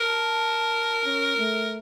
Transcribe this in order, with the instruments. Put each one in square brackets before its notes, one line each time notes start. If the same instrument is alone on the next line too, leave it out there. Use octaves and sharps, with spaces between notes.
[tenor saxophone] A#4 [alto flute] A5
[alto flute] C#4
A3